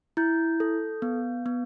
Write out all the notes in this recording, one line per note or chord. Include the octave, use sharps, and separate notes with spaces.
E4 G6
A4
B3
B3